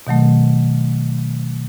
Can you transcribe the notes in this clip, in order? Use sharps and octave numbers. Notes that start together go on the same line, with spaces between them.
B2 D#3 F#3 A3